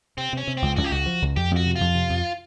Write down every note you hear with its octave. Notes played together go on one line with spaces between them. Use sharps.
C3 C4
C3 C#4
C3
C#2 C4
C#2 F#4
G4
C#2 F#4
F3
C#2
F2 G4
F2 F#4
C3
F4
F2
C3
F2